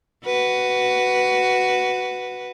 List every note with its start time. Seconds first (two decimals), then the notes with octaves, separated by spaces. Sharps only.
0.25 F#4 B4